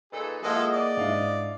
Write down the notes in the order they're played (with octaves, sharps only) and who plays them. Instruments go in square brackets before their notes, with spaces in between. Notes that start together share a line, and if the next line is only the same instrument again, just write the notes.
[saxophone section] A#2 D#4 A4 [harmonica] G#4 [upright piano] B4
[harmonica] F3 G#3 A4 [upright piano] A#3 E4 [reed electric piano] G#4 F#5 [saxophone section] D#5
[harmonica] D5
[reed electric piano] G#2 [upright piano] D4 E4 F5